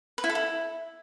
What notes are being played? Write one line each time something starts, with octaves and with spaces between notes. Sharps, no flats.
B4
E4
A4
E4